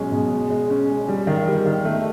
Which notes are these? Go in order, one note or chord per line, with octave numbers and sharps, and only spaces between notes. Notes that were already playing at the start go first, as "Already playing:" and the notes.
Already playing: B2 F#3 G#3 C#4
B2
G#3
G#3
C#4
G#3
G3
D#3
G3
D#3
A3